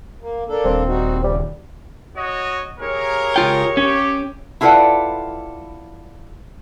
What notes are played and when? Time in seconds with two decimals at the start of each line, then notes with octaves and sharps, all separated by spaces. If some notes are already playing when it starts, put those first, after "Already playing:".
0.21 A#3
0.49 A#3 D4 A4
0.65 D#1 C4
0.88 G3 D#4 F#4
1.24 C#3 G3
2.16 F#4 C#5 D#5
2.80 D#2 G#4 A#4 C#5
3.36 C#2 F4 G5
3.77 C#4 G4
4.61 E4 F4 A4 B4 D5 F#5